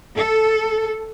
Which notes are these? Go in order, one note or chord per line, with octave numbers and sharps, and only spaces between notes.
A4